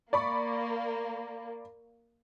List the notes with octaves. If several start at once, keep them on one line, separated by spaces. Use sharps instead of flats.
A#3 D5 B5 C#6